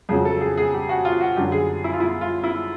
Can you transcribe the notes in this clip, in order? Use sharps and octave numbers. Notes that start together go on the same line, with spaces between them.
F2 C#3 F#3 G#4
A4
G#4
G#4
G4
F#4
F4
F#4
F#2 D3 F#3 G4
G#4
E4
F4
E4
F4
E4